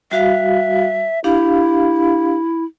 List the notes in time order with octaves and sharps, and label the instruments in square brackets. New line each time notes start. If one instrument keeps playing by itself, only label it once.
[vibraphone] G3 F#4 F5 [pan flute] E5
[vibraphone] D4 G4 F5 [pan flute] E4